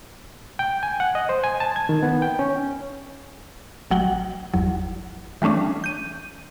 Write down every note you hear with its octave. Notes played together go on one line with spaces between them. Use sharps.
G5
G#5
F#5
D#5
C5
G#5
A5
G#6
D#3
B3
G5
C#4
A1 F#3 F#5 G5
G1 E2 F#3
E3 G3 A3 C#4 D4
G6 D#7